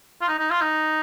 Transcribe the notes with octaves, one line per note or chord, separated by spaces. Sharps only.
F4
D#4
D#4
F4
D#4